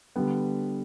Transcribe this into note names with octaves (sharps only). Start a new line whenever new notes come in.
D3 G3 B3